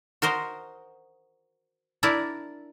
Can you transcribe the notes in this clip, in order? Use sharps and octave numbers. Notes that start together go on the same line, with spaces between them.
F#4 A#4 C5 D#5
D4 E4 A#4 D5